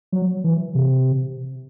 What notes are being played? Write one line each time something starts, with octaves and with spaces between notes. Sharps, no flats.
F#3
E3
C3